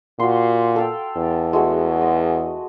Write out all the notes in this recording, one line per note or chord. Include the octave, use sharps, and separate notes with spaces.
A#2 F#4 C6
A4 F5 G5
E2
G#3 A3 F#4
D#5